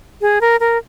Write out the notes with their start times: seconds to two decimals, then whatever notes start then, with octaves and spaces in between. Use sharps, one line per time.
0.21 G#4
0.41 A#4
0.60 A#4